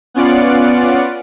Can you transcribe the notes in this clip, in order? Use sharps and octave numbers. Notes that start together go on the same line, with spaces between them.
B3 C#4 F4 D5 F#5